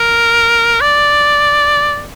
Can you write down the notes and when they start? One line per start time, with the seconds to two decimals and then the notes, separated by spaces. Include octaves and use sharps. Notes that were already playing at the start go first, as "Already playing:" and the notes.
Already playing: A#4
0.81 D5